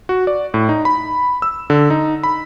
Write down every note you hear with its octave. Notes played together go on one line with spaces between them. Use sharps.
F#4
D5
A2
D#4
B5
E6
D3
D#4
B5